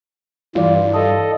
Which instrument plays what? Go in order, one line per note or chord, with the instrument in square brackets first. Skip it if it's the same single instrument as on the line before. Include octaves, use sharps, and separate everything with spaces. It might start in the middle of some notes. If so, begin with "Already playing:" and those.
[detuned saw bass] G2 [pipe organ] E3 [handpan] F4 D5
[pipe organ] A4 D#5